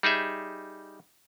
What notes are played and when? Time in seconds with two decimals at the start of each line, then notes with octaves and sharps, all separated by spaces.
0.03 G3 D#4 G#4 E5